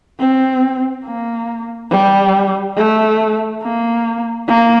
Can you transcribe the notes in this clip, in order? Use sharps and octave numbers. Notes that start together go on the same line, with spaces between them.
C4
A#3
G3
A3
A#3
A#3